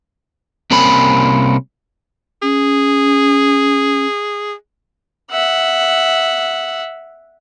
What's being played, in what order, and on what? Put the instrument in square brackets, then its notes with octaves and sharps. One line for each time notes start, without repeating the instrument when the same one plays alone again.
[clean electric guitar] C2 C3 A#3 C4 C#4 B5
[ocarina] C#4 [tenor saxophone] G#4
[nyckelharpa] E5 F#5